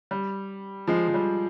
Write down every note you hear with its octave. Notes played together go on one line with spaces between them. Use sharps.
G3
F3 G#3
F3
G3